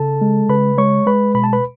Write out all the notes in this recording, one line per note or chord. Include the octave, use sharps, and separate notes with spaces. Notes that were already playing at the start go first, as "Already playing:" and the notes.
Already playing: C#3 A4 A5
G#3
C#3 B4 B5
G#3 C#5 C#6
G#3 B4 B5
B2 B5
A5
B4 B5